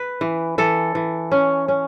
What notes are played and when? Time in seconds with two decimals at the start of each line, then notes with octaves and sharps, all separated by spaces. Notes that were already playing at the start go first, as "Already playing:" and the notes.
Already playing: B4
0.21 E3
0.58 E3 A4
0.95 E3
1.32 C#4
1.68 C#4